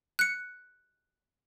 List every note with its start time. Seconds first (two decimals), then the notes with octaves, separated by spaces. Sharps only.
0.19 F#6 C#7